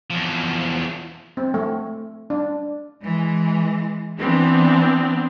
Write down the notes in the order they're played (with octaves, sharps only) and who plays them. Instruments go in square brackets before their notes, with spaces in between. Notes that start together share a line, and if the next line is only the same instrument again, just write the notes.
[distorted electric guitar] E2 F3
[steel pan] C4
A3
D4
[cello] E3 G#3
[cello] E3 [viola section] B3 C4 D4